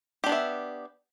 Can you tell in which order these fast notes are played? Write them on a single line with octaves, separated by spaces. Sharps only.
G4 D4 B3 E5